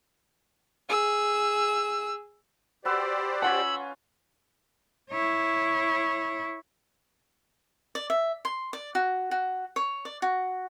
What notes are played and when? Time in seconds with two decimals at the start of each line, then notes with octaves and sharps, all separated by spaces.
0.89 G#4 E6
2.85 F#4 G4 B4 C5 D5 E6
3.42 C#4 F4 F#5 G#5 B5 E6
5.11 E4 C#5
7.95 D5
8.10 E5
8.45 C6
8.73 D5
8.95 F#4
9.31 F#4
9.76 C#5
10.05 D5
10.22 F#4